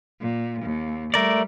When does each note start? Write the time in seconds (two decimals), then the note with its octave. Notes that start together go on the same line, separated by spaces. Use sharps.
0.21 A#2
0.62 D#2
1.14 G3 A3 A#4 D5